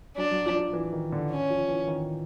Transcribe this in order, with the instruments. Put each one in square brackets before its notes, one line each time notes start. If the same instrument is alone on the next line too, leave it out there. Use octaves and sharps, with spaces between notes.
[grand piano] F#3 [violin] D4
[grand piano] F#3
F3
F3
E3
D#3
D3
[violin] C#4
[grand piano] F3
E3
D#3